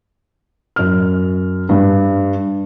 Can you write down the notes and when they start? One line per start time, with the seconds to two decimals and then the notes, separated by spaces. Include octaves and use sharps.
0.76 F#2 F6
1.69 G2 G3